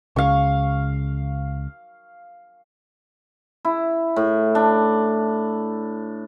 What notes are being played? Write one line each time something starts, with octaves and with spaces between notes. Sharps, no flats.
C#2 C#3 F5 C#6
E4
A2
D4